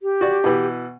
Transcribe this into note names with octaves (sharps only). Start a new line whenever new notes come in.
G4
F#4 D5
B2 E3